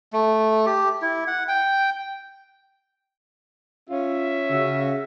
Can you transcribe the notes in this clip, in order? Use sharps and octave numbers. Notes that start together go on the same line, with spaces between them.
A3
G4
E4
F#5
G5
C#4 F4 E5
C#3 F#4